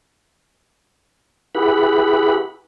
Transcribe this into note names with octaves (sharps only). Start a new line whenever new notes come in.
E4 G4 G#4 B4 F#5 B5